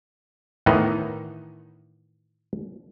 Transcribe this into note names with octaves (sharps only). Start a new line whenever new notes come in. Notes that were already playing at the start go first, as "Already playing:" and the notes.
A2 D#3 E3 B3 D#4